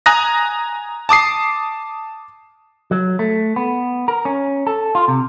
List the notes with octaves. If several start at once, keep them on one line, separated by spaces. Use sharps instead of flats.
G#5 A#5 D#6 F#6 A#6
A5 D6 D#6 C7
F#3
A3
B3
A#4
C#4
A4
F4
C3